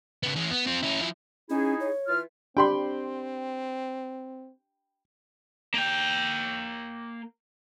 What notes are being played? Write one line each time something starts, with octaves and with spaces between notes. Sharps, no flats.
C#3 B3
E3 C#4
B3
C4 F4
C#4 E4
F3 E4
C#4 D#4 E4 G#4
C#5
E3 F4 F6
C4 D4 G4 G5 B5 C6
A#3 G5